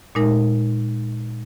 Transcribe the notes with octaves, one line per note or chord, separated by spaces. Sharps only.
A#2 G#3 D#4 A#4